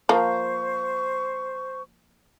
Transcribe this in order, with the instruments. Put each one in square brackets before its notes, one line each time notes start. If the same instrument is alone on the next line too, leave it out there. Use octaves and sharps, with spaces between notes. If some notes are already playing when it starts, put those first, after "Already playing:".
[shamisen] F3 A#3 [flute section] C5 C#6